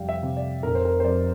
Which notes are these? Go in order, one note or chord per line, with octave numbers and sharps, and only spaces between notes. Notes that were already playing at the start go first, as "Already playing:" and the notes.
Already playing: F1 F2 G3 D5 F5 G5
E5
C3
D5
F1 A#4
C5
A#4
C5
F2 D5